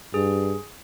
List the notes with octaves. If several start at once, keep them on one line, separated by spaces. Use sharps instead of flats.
G2 G#4